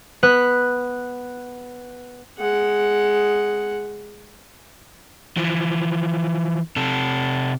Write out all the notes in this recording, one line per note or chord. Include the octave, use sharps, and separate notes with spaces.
B3 B4 F#6
G#3 F#5
E3 F3
C3 A4